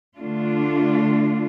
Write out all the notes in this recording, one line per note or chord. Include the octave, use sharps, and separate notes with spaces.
D3 A3 D4 F4